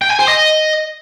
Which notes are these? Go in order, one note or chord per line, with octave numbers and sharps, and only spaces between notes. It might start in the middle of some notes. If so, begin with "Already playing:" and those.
G5
G#5
C5
D#5